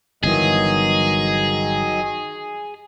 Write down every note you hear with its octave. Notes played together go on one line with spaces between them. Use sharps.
G1 D#3 E3 F#3 G#4 D#5